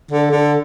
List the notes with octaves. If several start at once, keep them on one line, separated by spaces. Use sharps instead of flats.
D3
D3